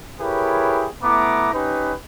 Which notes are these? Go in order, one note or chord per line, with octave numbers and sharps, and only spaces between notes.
E4 G4 G#4 A#4 B4 C#5
A3 B3 E4 A#5 D6
C#4 D#4 G4 B4